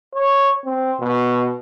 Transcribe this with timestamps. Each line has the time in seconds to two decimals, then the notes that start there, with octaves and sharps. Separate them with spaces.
0.14 C#5
0.65 C4
1.00 B2